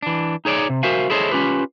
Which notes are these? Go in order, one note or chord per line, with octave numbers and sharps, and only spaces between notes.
E3 D4
D#4 G#4 C#5 D5
C3
F#4 A#4 C5 E5 F5 G#5
E4 G#4 A4 C5 C#5 D#5
C#4 F4 G4 B4